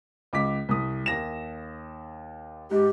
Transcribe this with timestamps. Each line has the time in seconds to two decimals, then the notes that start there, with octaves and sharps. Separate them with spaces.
0.33 C#2 D6 B6
0.69 C2 D#6
1.06 D#2 A#6 E7
2.71 G#2 G4